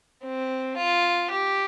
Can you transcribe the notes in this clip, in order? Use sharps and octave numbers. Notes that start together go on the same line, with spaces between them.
C4
F4
G4